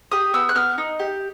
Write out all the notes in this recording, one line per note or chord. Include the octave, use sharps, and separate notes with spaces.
G4 D#6
B3 E6
F#6
B3 F6
D#4
G4